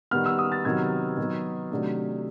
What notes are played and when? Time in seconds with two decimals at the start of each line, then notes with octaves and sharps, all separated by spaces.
0.11 D#3 G3 B3 F6
0.26 E6
0.39 D#6
0.52 A6
0.65 C3 D#3 F#3 B3 G#6
1.17 D#3 F#3 B3
1.71 C3 D#3 F#3 A3 D4